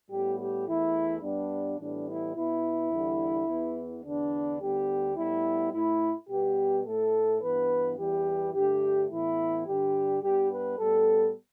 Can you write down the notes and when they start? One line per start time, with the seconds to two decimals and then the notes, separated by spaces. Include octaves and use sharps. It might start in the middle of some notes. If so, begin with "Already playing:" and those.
0.10 A2 G3 B3 G4
0.39 G4
0.66 E2 E3 A3 E4
1.22 G2 G3 B3 D4
1.78 A2 E3 G3 B3 D4
2.08 E4
2.35 B2 B3 E4
2.91 E2 D3 G3
3.47 E2 E3 B3
4.03 E2 D3 B3 D4
4.60 D2 D3 G3 B3 G4
5.16 A2 G3 B3 E4
5.72 A2 A3 E4
6.29 B2 G3 B3 G4
6.85 A2 A3 A4
7.42 G2 E3 B3 B4
7.98 E2 E3 G3 B3 G4
8.53 G2 D3 A3 G4
9.10 A2 E3 B3 E4
9.66 G2 D3 G3 G4
10.22 G2 G3 B3 G4
10.50 B4
10.78 A2 G3 B3 A4